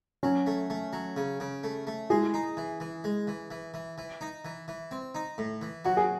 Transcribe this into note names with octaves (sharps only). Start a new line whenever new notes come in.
F#3 C#4
A3
A3
F#3
C#3
C#3
A3
A3
G#3 E4 G#4
D#4
E3
E3
G#3
E3
E3
E3
E3
D#4
E3
E3
C4
D#4
A2
E3
F#3 F#4
G#4